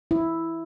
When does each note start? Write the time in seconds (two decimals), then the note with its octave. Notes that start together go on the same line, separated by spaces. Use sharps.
0.11 E4